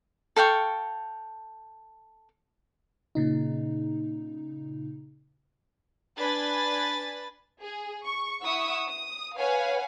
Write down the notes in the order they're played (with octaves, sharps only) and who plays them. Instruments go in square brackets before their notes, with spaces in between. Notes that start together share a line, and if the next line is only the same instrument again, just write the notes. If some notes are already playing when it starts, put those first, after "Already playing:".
[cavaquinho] A4 F5 G5 C#6
[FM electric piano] A#2 C#3 D#4
[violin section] D4 B4 G#5 B5 A6
G#4
C#6
E4 F#5 C#6 D#6 E6
D#6
B4 C#5 F5 F#5 G#5